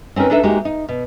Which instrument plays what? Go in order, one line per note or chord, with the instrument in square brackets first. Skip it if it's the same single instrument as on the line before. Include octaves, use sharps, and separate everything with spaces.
[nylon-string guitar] C4 C#4 D#4 A#4 B4
D4 D#4 A4 B4 E5
G#3 A#3 D#4 F#4 G4
D#4
B2